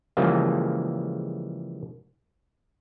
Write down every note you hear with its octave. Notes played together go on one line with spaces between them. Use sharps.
C#3 E3 F3 G3 G#3 A#3